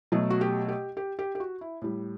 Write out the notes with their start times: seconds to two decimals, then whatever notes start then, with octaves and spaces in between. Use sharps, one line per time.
0.12 B2 F#3 A3
0.30 F#4
0.41 G4
0.68 G4
0.97 G4
1.19 G4
1.35 G4
1.40 F#4
1.61 E4
1.82 A2 G3